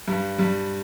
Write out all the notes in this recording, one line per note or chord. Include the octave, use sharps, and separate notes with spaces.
G2 G3
G2 G3